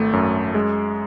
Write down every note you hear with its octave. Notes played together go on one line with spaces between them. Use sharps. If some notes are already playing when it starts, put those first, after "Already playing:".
Already playing: G#1 A3
F#2
G#3